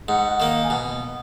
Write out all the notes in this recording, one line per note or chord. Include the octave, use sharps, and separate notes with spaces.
G#2 F#5
D#3 A#3
G#5
B2 F#5